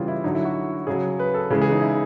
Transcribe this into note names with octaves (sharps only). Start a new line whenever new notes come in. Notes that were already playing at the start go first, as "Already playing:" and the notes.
Already playing: C#3 E3 G3 F4
E4
D3 F#3 D#4
E4
F#4
C#3 F#3 G#4
B4
A4
C#3 E3 G#3 G#4
G#4
D#4
E4